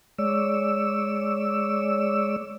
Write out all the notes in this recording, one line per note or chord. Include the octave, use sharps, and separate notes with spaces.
G#3 C#5 D5 E6